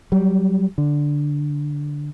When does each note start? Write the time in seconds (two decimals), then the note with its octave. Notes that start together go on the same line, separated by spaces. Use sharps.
0.12 F#3 G3
0.78 D3